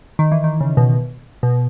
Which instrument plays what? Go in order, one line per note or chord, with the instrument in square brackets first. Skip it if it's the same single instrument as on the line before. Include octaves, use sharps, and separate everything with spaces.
[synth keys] D#3
E3
D#3
C#3
B2
B2